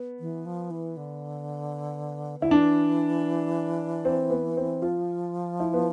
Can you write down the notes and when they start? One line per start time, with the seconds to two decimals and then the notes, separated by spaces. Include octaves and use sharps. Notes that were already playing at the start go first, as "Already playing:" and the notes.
Already playing: B3
0.20 E3
0.45 F3
0.71 E3
0.97 D3
2.40 D3 E4
2.51 E3 D4
4.05 C4
4.30 B3
4.57 C4
4.82 F3 F4
5.60 E4
5.74 B3